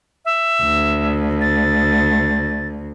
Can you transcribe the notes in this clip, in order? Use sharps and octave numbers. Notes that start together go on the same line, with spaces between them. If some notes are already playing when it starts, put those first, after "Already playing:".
E5
D2
A6